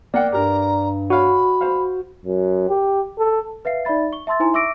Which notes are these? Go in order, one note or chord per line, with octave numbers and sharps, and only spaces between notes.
A#3 D5 F#5 G5
G2 G4 A#4 A#5
F#4 C#5 F5 B5
C5 F5
F#2
G4
A4
B4 E5 F5 C7
D#4 D5 E5 B5 A6
C#6 G7
E5 A5 C6 E6 A6
D#4 E4 C5 G#5 A#5 C6
E5 C#6 D6 E6 A#6 D7